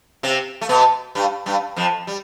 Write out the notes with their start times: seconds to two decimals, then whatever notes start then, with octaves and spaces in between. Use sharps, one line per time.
0.23 C3 C4
0.61 A3
0.69 B2 B3
1.15 G2 G3
1.46 G2 G3
1.76 F2 F3
2.07 G3